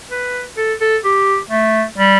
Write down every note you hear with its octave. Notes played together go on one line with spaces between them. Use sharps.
B4
A4
A4
G4
A3
G3